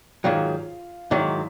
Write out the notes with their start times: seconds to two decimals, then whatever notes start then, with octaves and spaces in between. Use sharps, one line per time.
0.24 G#2 D#3 F#3 F4 F5
1.11 G#2 D#3 F#3 E4 E5